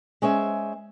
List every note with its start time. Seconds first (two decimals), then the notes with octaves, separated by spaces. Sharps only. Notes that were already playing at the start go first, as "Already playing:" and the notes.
0.22 G#3 C#4 C5 E5